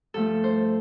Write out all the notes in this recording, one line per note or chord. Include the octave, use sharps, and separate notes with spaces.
G2 F3 A3 A4
C5